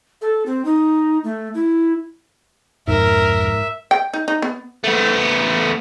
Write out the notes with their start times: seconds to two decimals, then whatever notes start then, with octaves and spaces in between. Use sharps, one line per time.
0.22 A4
0.46 C4
0.65 D#4
1.24 A3
1.54 E4
2.88 C2 F2 G#2 B2 A#4 E5
3.91 G5
4.14 D#4
4.28 D#4
4.42 B3
4.84 A3 B3